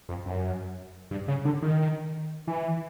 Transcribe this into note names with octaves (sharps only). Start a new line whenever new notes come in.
F2
F#2
G2
C#3
D3
D#3
E3